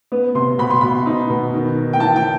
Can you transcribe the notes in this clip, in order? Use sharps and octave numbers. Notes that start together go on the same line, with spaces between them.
B3
C3 C6
B2 B5
C6
B2 B5
D#4
B2
D#3
D#3
G5
E3 A5
G5